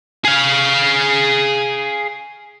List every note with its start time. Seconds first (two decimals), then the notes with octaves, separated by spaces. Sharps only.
0.25 G#4 F5